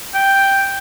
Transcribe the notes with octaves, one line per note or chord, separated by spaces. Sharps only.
G5